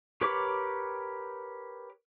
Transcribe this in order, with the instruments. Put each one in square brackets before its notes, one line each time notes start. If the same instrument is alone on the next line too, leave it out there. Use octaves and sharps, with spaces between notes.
[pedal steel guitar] G4 A#4 B4 C#5 D6